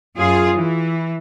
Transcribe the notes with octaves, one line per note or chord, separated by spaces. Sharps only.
F#2 F4 G#4
E3